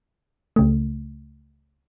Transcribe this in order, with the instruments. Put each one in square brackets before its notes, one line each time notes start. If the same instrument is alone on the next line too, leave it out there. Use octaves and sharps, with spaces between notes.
[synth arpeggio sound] C#2 C#3 A3